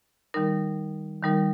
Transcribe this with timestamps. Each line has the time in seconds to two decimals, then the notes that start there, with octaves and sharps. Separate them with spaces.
0.34 D#3 G3 D#4 A#4
1.23 D#3 G3 D#4 A#4